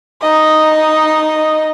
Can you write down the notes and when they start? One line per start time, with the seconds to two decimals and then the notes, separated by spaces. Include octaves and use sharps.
0.22 D#4 D#5